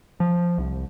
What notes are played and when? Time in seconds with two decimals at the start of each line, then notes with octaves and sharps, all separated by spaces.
0.20 F3
0.58 C2